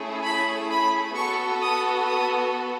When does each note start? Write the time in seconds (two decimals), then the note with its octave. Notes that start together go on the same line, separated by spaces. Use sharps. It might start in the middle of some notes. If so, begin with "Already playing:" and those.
Already playing: A3 C#4 E4 G#4
0.24 B5
0.70 B5
1.15 B3 F#4 A4 C#6
1.62 D#6
2.08 D#6